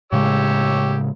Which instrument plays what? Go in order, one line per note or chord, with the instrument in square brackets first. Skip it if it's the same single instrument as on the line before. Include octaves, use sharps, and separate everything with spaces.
[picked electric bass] A2 C#3 G#3 [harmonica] G4 C#5 E6